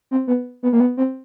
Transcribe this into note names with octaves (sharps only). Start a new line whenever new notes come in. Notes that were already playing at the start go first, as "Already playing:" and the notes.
C4
B3
B3
A#3
B3
C4